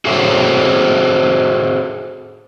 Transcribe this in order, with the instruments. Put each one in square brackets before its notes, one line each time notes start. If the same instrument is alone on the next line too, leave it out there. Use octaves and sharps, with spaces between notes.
[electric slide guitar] F#4 G#4 A4 C5 C#5 E5